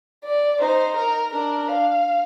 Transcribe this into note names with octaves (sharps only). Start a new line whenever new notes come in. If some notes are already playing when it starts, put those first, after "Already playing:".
D5
D#4 C5
A#4
D4 A#4
F5